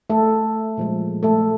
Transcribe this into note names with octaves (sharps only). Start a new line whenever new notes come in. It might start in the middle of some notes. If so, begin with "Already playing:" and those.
A3 A4
A#2 F3 G#3
A3 A4